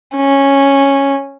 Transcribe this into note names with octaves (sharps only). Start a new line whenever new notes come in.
C#4